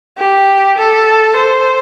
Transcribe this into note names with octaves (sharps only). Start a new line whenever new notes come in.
G4
A4
C5